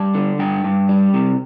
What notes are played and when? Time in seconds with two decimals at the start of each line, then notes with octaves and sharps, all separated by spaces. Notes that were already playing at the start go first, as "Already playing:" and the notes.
Already playing: G3 A5
0.15 D3
0.39 G2 G5
0.64 G2
0.89 G3
1.14 C3